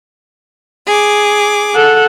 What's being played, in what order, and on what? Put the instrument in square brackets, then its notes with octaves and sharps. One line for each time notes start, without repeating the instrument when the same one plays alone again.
[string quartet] G#4 D6
[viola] A4 F#5